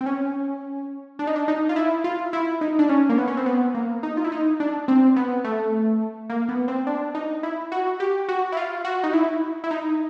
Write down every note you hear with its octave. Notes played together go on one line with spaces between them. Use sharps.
C4
C#4
D4
D#4
D4
D#4
F4
E4
F4
E4
D#4
D4
C#4
A#3
B3
C#4
C4
B3
A#3
D#4
F4
E4
D#4
D4
C4
B3
A3
A#3
B3
C4
D4
D#4
E4
F#4
G4
F#4
E4
F4
F#4
D#4
E4
E4
D#4